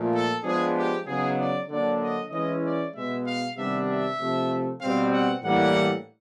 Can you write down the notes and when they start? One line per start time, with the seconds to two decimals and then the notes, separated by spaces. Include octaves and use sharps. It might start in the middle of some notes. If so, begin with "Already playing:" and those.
Already playing: A#2 F3 A3
0.12 A4
0.43 F3 G#3 B3 D4 G#4
0.74 G4
1.05 C#3 F#3 B3 D#4 G#4
1.37 D5
1.68 D3 F#3 A#3 D4 D5
2.00 D#5
2.30 E3 G#3 C#4 E4 D#5
2.63 D5
2.94 B2 G#3 B3 E5
3.25 F5
3.55 C3 D#3 G3 B3 D4 E5
3.87 E5
4.18 C3 F3 A3
4.80 B2 G3 C4 F5
5.11 F#5
5.42 A2 E3 G3 A#3 D4 F#5